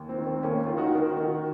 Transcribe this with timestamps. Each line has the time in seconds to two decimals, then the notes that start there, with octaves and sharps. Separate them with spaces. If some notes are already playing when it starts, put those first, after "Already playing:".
Already playing: D#2
0.09 C4
0.18 D#3
0.27 C4
0.43 D#2 A#3 C#4
0.66 D#3 F4
0.77 D#4 F#4
0.95 D#3 A#4
1.17 D#3 F#4 A#4